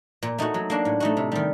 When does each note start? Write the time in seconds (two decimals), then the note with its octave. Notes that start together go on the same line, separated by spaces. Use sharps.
0.23 A#2
0.38 A3 D#4 F#4
0.54 F#3
0.70 A#3 D4 F#4
0.85 A2
1.00 A3 D#4 F#4
1.17 C3
1.32 D#3 G3